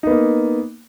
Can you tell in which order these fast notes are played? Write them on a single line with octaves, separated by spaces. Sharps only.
D#4 B3 A#3